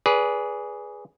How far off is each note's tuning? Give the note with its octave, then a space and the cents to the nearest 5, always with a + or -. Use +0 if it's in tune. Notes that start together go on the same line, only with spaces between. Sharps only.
G#4 +0 B4 -15 D5 -35